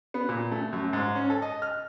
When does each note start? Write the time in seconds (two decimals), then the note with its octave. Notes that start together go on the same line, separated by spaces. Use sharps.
0.14 B3
0.29 A#2
0.51 A3
0.73 F#2
0.93 G#2
1.15 C#4
1.30 A4
1.42 D#5
1.62 F6